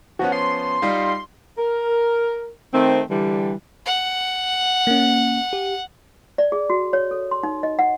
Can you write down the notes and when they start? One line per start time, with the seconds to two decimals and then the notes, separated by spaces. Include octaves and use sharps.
0.19 F3 B3 C#4 F#4
0.32 C6
0.82 G3 D#4 F4
1.58 A#4
2.73 D#3 A3 C4
3.10 D3 E3 G3
3.86 F#5
4.87 A#3 C#4
5.53 G4
6.38 D5
6.52 G#4
6.70 F#4
6.93 C#5
7.11 A4
7.31 C6
7.43 D#4
7.63 D#5
7.79 F#5